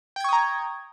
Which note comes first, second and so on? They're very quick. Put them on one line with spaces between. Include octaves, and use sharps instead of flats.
G5 G#6 C#6 D#6 A#5